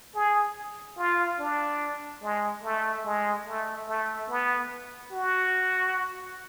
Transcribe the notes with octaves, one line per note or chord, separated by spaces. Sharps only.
G#4
F4
D4
G#3
A3
G#3
A3
A3
B3
F#4